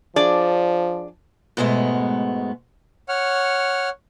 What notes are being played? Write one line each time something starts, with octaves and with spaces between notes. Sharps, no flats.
F3 D4 G#4 D5
G#2 B2 G#3 A3 B3
C#5 F#5 F6